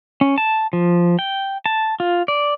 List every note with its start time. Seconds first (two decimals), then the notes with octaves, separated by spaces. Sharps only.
0.21 C#4
0.38 A5
0.73 F3
1.19 G5
1.66 A5
2.00 F4
2.28 D5